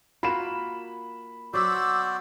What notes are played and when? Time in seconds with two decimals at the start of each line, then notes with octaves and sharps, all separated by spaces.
0.23 A#3 F4 F#4 B5 E7
1.53 F#3 B3 F#4 C5 D5 D6 E6